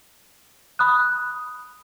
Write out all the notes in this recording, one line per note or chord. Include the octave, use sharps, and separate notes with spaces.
B5 D#6 F#6